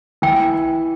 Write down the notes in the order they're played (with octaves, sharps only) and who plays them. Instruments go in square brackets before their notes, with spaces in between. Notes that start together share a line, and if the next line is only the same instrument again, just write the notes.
[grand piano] E3 [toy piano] G5